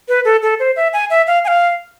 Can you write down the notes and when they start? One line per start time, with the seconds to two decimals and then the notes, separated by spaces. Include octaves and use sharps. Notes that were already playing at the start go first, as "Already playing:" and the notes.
0.08 B4
0.25 A4
0.43 A4
0.60 C5
0.76 E5
0.93 G#5
1.10 E5
1.27 F5
1.45 G#5
1.48 F5